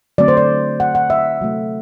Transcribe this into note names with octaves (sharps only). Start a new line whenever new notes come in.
D3 F#3 A3 C4 D5
C5
D5
F#5
F#5
E5
C3 F#3 A3